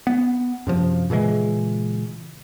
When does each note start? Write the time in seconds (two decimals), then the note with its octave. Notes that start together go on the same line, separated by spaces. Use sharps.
0.07 B3
0.67 F#2 C3 F3
1.10 A#2 C#3 E3 G#3